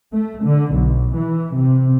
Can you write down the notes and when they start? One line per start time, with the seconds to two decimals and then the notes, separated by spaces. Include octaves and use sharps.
0.13 A3
0.44 D3
0.73 B1
1.13 E3
1.54 C3